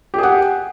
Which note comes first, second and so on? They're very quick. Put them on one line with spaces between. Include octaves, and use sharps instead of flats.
G4 G#4 F#5